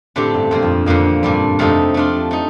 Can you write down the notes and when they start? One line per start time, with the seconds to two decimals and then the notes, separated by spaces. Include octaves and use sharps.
0.16 A2 D3 A3 C4 G4
0.34 G2
0.51 G2 A#2 F3 C4
0.62 F2
0.86 F2 D3 F3 A#3
1.23 G2 A#2 G3 D4
1.59 F2 C3 F3 A3 D#4 A4
1.94 A3 D4 F4
2.31 A3 D#4